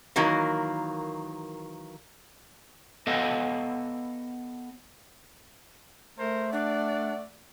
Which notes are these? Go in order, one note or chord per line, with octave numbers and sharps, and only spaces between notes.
D#3 E3 F#3 A#3
B3 A4 D#5 F5
A3 A#4 C5
D4 D5 F#5